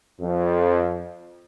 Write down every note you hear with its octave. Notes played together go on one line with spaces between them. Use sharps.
F2